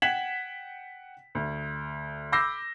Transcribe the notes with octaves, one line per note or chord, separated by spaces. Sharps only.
F#5 G5 G#6 B6 E7 F#7
D2
B5 D6 E6 G6 A#6 C7